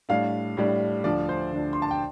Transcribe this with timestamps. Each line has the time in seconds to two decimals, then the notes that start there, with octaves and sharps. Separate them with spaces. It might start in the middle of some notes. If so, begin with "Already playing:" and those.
0.09 A2 G3 D4 F5
0.57 A2 G3 D4
1.04 D2 D3 F3 D4 D5
1.29 C5
1.53 D2 D3 F3 D4
1.73 C6
1.82 A5
1.91 G5